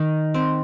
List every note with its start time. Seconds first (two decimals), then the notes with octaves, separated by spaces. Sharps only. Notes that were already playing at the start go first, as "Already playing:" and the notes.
Already playing: D#3
0.34 C4